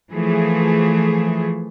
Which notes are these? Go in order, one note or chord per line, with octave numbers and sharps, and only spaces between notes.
E3 F3 A3 G#4